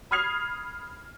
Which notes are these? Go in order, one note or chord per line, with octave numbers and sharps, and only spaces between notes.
B5 D#6 F6 G#6 C7 F7